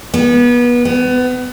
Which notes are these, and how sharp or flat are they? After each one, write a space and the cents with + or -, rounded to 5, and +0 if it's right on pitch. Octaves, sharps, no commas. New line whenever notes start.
B3 -30
B3 +25